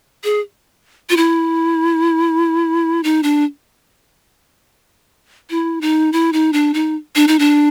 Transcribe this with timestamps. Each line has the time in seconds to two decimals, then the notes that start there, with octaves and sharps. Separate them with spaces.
0.24 G#4
1.10 F4
1.17 E4
3.04 D#4
3.23 D4
5.50 E4
5.81 D#4
6.13 E4
6.33 D#4
6.53 D4
6.74 D#4
7.16 D4
7.28 D#4
7.39 D4